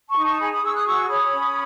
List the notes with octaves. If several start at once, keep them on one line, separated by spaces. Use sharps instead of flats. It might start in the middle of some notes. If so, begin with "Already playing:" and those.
A5 C#6
D#4
A5 C#6
G#4 G#5 B5
B5 D#6
G#4 C#6 E6
D#6 F#6
F#4 C#6 E6
C#5 B5 D#6
C#4